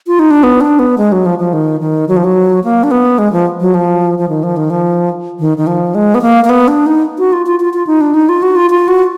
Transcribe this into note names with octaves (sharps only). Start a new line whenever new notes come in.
F4
D#4
D4
B3
D4
B3
G#3
F#3
F3
F3
D#3
D#3
F#3
F3
F#3
A#3
D4
B3
G#3
F3
F#3
F3
F3
D#3
F3
D#3
F3
D#3
D#3
F3
G#3
B3
A#3
A#3
B3
D4
D#4
F#4
F4
F4
F4
F4
D#4
D4
D#4
F4
F#4
F4
F4
F#4